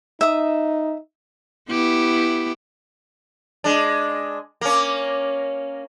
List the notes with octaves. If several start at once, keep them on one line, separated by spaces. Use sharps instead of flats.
D#4 E5 D#6
B3 E4 G4
G#3 D4
A#3 C#4